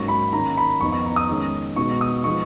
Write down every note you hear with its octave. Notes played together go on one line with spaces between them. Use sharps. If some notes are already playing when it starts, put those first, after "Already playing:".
Already playing: G#2 F#3 A#3 C#4 C#6
B5
D#3 A#3 C#4 A#5
B5
F2 F3 B3 D#4 C#6
C#6
A#5
D#6
D#3 G#3 C#4
B2 G#3 B3 D#4 C#6
D#6
F3 G#3 B3 D#4 C#6